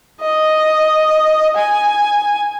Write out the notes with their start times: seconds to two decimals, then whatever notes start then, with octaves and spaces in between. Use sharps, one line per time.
0.21 D#5
1.56 G#5